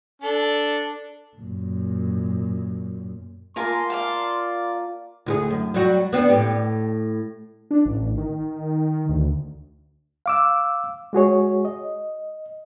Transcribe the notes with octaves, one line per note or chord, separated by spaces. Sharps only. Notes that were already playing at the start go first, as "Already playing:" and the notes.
D4 A4
F#2 A#2
A#3 F4 A#4 G#5 A5 C6
D5 F5 A5
D2 F4 G#4
F#2
F#3 G3 F#4
B3 C4 D4
A2 G4
D4
A1
D#3
D2
F5 D6 E6
G#3 F#4 G#4 C#5
D#5